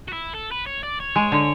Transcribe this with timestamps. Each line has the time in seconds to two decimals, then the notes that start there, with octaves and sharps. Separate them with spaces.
0.08 F#4
0.13 E4
0.35 A4
0.52 B4
0.67 C#5
0.83 D5
1.00 C#5
1.16 G#3
1.32 D3